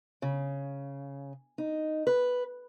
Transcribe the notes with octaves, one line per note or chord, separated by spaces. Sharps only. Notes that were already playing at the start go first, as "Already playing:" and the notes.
C#3
D#4
B4